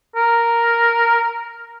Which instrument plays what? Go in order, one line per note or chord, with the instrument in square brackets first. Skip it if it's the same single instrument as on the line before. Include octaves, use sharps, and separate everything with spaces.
[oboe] A#4